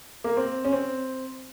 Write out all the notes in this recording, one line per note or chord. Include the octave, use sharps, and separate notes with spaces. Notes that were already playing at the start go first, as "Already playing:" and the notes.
A#3
C4
C#4
C4